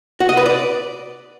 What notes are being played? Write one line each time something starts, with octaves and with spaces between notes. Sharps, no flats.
F#4
D#5
B4
D5